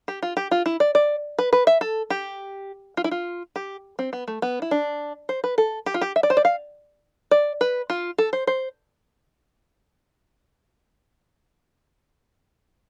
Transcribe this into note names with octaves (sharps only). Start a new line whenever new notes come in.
G4
F4
G4
F4
E4
D5
D5
B4
B4
E5
A4
G4
F4
E4
F4
G4
C4
B3
A3
B3
E4
D4
C5
B4
A4
G4
F4
G4
E5
D5
C5
D5
F5
D5
B4
F4
A4
C5
C5